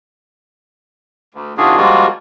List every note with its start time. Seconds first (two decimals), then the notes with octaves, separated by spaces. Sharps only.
1.34 D2
1.58 C3 D#3 D4 F4 F#4 G#4
1.77 F3 G3 G#3 A#3 F4 F#4